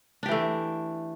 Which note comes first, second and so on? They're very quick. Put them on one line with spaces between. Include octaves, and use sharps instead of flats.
D4 G4 E3 A3